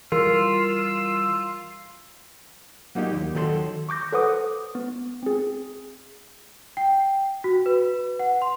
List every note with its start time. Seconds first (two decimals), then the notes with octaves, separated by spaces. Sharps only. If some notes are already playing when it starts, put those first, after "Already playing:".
0.12 E3 G3 F4 A#4 E6
2.95 F#3 A#3 D#4 F4 G4
3.13 D#2
3.35 D#3 F#3 A4 G#5 C6
3.89 C#6 D6 G6 A#6
4.12 A4 B4 C5 F#5 D6 D#6
4.75 B3
5.23 C4 G#4
6.77 G5
7.44 F#4
7.66 B4
8.19 F#5
8.42 C6